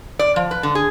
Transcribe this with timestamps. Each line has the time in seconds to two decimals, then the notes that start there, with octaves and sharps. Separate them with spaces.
0.19 D5
0.36 F3
0.51 B4
0.63 D3
0.75 G#4